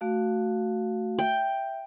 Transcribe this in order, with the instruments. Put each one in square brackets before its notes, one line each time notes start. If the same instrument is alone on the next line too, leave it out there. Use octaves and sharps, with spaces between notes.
[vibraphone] A3 F#4 F5
[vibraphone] E5 [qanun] G5